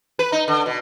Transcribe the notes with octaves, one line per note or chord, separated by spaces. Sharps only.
B4
D#4
D3
B2